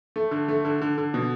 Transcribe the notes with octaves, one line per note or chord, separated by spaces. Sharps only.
A3
D3
A3
D3
D3
D3
B2